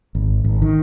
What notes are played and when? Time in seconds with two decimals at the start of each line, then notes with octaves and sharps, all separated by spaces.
0.15 G#1
0.44 G#1
0.62 D#3